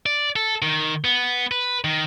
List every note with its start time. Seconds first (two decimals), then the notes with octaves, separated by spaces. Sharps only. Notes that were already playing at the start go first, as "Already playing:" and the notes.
0.06 D5
0.36 A4
0.62 D#3
1.05 B3
1.52 B4
1.84 D#3